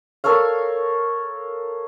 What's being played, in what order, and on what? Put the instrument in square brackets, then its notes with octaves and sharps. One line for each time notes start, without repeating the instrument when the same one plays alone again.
[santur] A4 A#4 C#5 F5